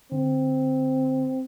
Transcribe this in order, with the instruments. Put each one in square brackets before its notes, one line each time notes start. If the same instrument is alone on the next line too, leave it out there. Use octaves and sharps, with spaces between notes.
[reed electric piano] D3 [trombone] C4